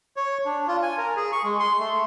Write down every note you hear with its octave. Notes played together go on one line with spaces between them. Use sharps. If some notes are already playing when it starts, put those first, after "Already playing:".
C#5
D4
F4
G#5
A#4
G#4
C#6
G#3
C6
A3